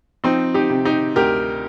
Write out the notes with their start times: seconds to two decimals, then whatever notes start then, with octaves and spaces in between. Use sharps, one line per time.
0.24 F3 C4 D#4
0.54 D#4 G4
0.70 C3
0.85 D#4 G4
1.16 D2 G4 A#4